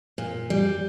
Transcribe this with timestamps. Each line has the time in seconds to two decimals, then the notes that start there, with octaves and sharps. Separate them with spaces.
0.18 A#2
0.50 G3